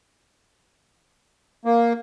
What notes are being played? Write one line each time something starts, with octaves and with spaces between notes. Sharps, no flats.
A#3